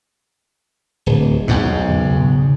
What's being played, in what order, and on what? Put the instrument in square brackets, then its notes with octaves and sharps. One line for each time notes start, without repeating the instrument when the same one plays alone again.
[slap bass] D1
[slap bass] B1 G#2 B2 [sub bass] E2
[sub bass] C#3